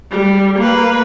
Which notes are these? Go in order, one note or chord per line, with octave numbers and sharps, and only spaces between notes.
G3
A#3 B4